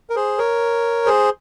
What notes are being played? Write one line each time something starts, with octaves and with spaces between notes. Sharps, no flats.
A#4
G#4 C5
A#4 C#5
G#4 C5